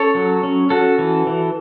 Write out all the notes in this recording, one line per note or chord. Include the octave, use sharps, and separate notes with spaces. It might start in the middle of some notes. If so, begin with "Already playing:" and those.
Already playing: C#4 A4 C#5
F#3
C#4
C#4 F#4 A4
E3
E3